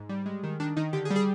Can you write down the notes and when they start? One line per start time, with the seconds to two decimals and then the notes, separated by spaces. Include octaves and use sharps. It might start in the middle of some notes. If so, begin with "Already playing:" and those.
Already playing: G#2
0.09 G3
0.26 G#3
0.44 D#3
0.60 D#3 D4
0.77 D#3 D#4
0.93 D3 G4
1.05 G#4
1.10 G3
1.16 G#4